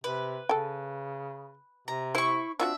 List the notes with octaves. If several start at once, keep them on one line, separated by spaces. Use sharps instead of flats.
C3 B4
C#3 A4 G5
C3 A#5
E4 C5 C#6
C4 D4 F4 F#4 E5